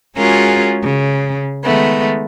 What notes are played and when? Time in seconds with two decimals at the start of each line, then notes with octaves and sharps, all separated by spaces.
0.16 G#3 C#4 F4 F#4 G#4 A#4
0.82 C#3
1.65 D#3 G#3 A3 B3